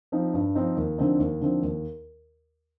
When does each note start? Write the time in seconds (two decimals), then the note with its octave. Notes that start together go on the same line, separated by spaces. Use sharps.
0.12 F3 C4 D#4
0.34 G2
0.55 F3 C4 D#4
0.77 D#2
0.98 D3 F3 C4 D#4
1.19 D#2
1.41 D3 F3 C4 D#4
1.62 D#2